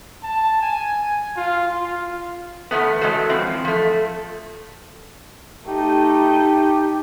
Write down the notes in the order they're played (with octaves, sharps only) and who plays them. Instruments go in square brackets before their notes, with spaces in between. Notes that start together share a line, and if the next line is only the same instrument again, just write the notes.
[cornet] A5
G#5
F4
F4
[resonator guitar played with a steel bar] E2 A#2 A3 B3
F#3 G#3 A3 A4 C5
E3 F3 C4
F3 A3
[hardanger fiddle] A3 D#4 [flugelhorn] G4